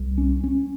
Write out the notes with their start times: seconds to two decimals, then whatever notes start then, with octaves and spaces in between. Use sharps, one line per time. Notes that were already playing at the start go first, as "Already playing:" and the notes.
Already playing: C2
0.18 C#4
0.44 C#4